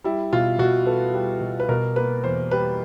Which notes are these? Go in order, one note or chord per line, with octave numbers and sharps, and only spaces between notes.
G3 E4
B2 F4
B2 F#4
B3 A4
G3
B2
B4
B2 A#4
A#3 B4
E2 C5
G3 B4